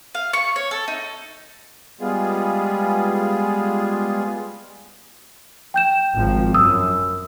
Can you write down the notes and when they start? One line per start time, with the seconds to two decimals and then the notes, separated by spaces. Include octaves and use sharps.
0.15 F5
0.33 C#6
0.56 C#5
0.71 A4
0.88 D#4
2.01 G3 G#3 B3 F4 G#4
5.74 G5 G6 E7
6.13 G#1 F3
6.55 F#2 D#6 E6